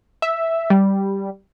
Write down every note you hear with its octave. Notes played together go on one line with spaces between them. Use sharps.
E5
G3